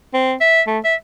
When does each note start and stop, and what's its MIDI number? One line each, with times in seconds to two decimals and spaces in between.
0.14 0.35 60
0.41 0.62 76
0.67 0.79 57
0.84 0.95 76